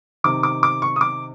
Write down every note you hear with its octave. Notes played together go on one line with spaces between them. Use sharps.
C3 D#3 D6
D6
D6
C#6
D#6
D6